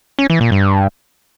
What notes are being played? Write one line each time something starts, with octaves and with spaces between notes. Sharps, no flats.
C#4
E3
A#2
G2